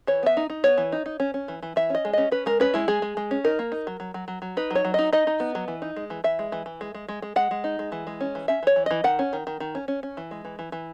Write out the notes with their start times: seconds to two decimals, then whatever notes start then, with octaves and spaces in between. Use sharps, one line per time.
0.07 E3 C#5
0.23 B3 E5
0.37 D#4
0.50 D#4
0.64 B3 C#5
0.78 E3
0.92 D#4
1.06 D#4
1.20 C#4
1.34 C#4
1.48 E3
1.63 E3
1.76 E3 E5
1.90 C#4 D#5
2.05 G#3
2.13 C#4 D#5
2.32 C#4 B4
2.46 G#3 A#4
2.60 C#4 B4
2.74 G#3 E4
2.88 G#3 G#4
3.02 G#3
3.17 G#3
3.31 C#4
3.44 D#4 A#4
3.59 A#3
3.72 D#4
3.87 F#3
4.00 F#3
4.14 F#3
4.28 F#3
4.42 F#3
4.57 D#4 B4
4.71 F#3 C#5
4.85 F#3
4.94 D#4 D#5
5.13 D#4 D#5
5.27 D#4
5.40 B3
5.55 F#3
5.68 E3
5.82 D#4
5.96 G#3
6.10 E3
6.24 E3 E5
6.39 G#3
6.52 E3
6.66 E3
6.81 G#3
6.95 G#3
7.09 G#3
7.22 G#3
7.36 G#3 F#5
7.51 G#3
7.64 D#4
7.79 G#3
7.92 E3
8.07 G#3
8.21 C#4
8.35 E3
8.48 C#4 E5
8.63 E3 C#5
8.76 E3
8.86 E3 D#5
9.04 D#3 F#5
9.19 C#4
9.33 D#3
9.47 D#3
9.60 D#3
9.75 C#4
9.88 C#4
10.03 C#4
10.17 E3
10.31 G#3
10.45 E3
10.59 E3
10.72 E3